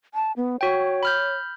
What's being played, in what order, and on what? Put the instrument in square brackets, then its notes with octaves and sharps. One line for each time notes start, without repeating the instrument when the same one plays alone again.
[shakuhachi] A5
B3
[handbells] F#4 G5 [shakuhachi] C#5
[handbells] B5 F6 G6